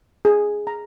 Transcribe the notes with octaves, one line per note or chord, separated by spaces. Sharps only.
G#4
A#5